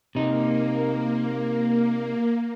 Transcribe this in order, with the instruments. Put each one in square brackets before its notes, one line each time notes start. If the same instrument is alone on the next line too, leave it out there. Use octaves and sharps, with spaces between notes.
[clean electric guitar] C3 D#4 [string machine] A#3